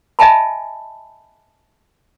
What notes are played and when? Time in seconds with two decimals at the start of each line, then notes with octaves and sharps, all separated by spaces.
0.19 D#5 E5 G#5 A5 B5